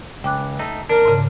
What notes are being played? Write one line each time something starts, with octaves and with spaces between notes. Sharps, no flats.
C#2 G5 D6 F#6
A3 D#4
D#2 D4 A#4
G#2 C#3